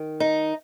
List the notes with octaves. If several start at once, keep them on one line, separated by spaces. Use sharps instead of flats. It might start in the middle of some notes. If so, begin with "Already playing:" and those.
Already playing: D#3
D#4